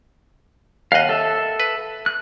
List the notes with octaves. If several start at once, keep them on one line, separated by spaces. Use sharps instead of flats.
D#2 D#5 F5 F#5
A4 E5
B4
F#6